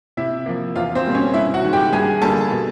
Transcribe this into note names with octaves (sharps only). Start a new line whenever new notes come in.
C3 E4 E5
F3 A#3
E2 F4 F5
C4 C5
B2 G3 A#3
C#4 C#5
G2 E4 E5
F#4 F#5
D#3 G#3
G4 G5
G2 G#4 G#5
D3 G3 A#3 A4 A5
B2